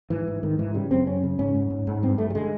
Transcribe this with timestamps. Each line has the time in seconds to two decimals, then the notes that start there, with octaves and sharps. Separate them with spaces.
0.10 G#2 E3
0.27 G#2
0.43 G#2 D#3
0.59 G#2 E3
0.74 C#3 G3
0.91 F#2 C4
1.06 F#2 C#4
1.23 C#3
1.39 G#2 C#4
1.54 G#2
1.70 G#2
1.87 G#2
2.03 G2 C4
2.18 G2 A3
2.30 G3
2.35 D3 G#3